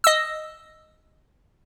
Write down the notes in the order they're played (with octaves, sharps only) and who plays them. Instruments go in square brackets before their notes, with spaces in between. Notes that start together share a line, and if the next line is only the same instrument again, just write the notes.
[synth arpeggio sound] D#5 E6